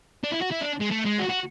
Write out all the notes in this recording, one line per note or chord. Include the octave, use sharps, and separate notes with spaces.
D4
E4
F#4
E4
D4
G#3
A3
G#3
F#4
F#4